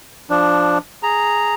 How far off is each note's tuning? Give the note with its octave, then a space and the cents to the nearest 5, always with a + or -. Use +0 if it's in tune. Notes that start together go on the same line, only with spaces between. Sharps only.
F3 +0 D4 +0
G#4 +0 A#5 -5